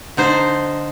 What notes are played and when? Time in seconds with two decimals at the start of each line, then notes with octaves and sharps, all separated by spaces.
0.17 D3 D#4 C5